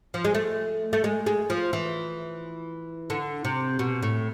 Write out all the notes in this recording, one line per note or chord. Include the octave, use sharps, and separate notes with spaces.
F3
G#3
A3
A3
G#3
G#3
F3
E3
D3
C3
B2
A2